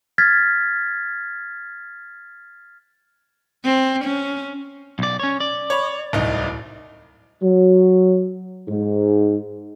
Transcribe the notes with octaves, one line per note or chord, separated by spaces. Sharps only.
F6 G#6 A6 B6
C4
C#4
B1 D5
C#4 C#5
D5
C#5 B5
D1 C2 D#4
F#3
G#2